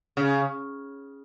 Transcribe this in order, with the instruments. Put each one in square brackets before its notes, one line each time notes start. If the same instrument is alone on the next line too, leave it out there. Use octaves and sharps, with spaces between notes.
[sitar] C#3